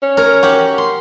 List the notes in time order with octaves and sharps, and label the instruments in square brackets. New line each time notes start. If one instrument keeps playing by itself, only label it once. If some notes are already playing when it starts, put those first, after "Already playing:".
[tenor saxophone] C#4
[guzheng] A#4 C#5 A#5
F#4 G4 F#5
C6